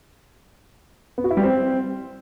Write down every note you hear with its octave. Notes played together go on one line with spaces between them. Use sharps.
B3
F#4
E4
G3
C4